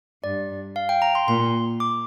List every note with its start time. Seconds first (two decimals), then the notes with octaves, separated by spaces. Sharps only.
0.24 G2 D5
0.76 F5
0.89 G5
1.02 A#5
1.15 C6
1.28 A#2 C6
1.80 D6